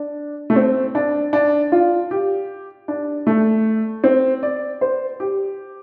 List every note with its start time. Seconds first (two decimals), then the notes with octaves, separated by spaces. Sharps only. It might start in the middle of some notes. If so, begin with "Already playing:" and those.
Already playing: D4
0.50 A3
0.56 C4
0.95 D4
1.33 D4
1.72 F4
2.11 G4
2.88 D4
3.27 A3
4.04 C4
4.43 D5
4.81 C5
5.20 G4